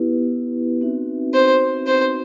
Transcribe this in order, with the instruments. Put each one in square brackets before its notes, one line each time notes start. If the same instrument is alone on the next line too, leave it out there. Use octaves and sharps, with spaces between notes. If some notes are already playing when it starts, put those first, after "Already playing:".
Already playing: [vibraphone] B3 E4 G4 B4
C4 D#4 F#4 B4 E5
[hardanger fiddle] C5
C5